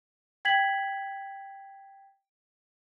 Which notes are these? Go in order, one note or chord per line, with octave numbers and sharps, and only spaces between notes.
G5 G#6 B6 F#7